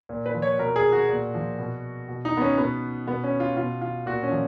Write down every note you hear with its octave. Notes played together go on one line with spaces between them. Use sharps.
A#2
B4
F3
C#5
B2 A#4
G#4
F#4
A#2
F3
B2
B2
D#4
B3
C#4
B2 B3
B2 B3
C#4
F4
B2 F4
F4
A#2 F#4
C#4
F3